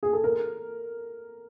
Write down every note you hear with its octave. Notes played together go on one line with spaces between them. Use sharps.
G#4
A4
A#4